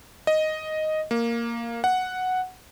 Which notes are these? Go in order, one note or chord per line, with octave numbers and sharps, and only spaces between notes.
D#5
A#3
F#5